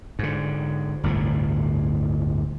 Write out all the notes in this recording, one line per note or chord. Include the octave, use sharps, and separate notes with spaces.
G#2 D3
G1 D2 A2 C3